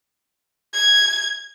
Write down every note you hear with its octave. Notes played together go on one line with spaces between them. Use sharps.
G#6